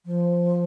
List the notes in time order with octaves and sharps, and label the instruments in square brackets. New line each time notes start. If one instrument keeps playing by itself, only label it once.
[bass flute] F3